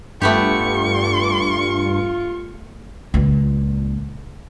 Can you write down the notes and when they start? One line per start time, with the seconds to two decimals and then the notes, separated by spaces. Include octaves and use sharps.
0.22 G2 A3 B3 F4 G4 C#6
3.14 C#2 A#2